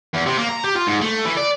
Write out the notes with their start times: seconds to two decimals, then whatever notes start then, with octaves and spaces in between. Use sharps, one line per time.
0.14 E2
0.26 C3
0.38 A#3
0.49 A#5
0.64 G4
0.76 F4
0.87 G#2
1.01 A3
1.25 E3
1.37 D5